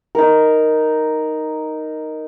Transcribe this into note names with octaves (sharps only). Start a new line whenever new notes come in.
D#4 A#4